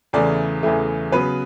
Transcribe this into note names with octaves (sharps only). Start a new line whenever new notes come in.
E2 C#3 E3 A3 D5
E2 C#3 E3 A3
C#3 F#3 B3 B4